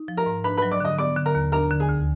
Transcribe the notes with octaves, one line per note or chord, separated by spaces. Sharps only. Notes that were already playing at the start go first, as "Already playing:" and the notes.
Already playing: D#4
F3
A#4 A#5
G#2
D4 B4 B5
F#3 B4 B5
D5 D6
D3 D#5 D#6
B3 D5 D6
D3
A#4 A#5
D#2
D4 A#4 A#5
D3
G#4 G#5
D2